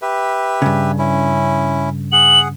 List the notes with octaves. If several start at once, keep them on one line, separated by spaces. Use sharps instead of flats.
G4 B4 E5
G2 C#3
C#4 E4
G#4 F#5 F#7